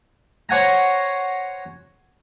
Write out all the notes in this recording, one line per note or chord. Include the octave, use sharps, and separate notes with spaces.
C5 C#5 F#5 G#5 A#5